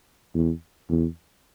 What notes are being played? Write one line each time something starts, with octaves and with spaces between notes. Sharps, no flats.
E2
E2